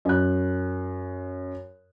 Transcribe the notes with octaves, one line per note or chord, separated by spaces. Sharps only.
F#2 F#6